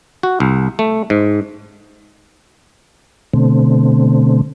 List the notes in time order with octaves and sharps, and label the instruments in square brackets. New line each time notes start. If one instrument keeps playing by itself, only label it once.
[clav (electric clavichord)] F#4
C2
A3
G#2
[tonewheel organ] B2 D3 A3 C4